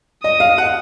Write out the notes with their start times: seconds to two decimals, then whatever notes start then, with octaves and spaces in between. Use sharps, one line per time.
0.23 D#5 D#6
0.40 F5
0.58 F#5